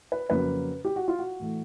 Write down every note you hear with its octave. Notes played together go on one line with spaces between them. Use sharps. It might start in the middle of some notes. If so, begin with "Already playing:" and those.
B4
F2 C#3 F#3 A#3 B4
G4
F#4
F4
F#4
A2 E3 A3